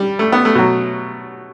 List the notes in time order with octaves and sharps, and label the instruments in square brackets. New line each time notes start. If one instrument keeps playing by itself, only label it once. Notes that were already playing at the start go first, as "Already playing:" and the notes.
Already playing: [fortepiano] G3
A3
B3
A3
B2 F#3